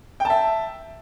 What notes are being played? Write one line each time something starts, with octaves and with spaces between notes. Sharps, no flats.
E5 G5 A5